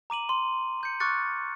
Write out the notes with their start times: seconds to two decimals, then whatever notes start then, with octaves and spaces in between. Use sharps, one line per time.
0.10 A#5 D6 D#7 F#7
0.29 C6
0.81 C6 G6 C#7
1.00 C#6 D6 F6 F#6 A6 C#7